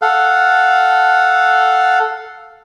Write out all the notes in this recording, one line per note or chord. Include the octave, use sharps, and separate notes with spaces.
A4 F5 F#5